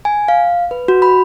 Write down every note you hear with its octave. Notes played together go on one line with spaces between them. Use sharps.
G#5
F5
B4
F#4
B5